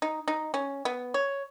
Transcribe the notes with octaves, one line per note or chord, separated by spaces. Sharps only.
D#4
D#4
C#4
B3
C#5